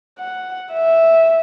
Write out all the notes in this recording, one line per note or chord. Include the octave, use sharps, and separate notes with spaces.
F#5
E5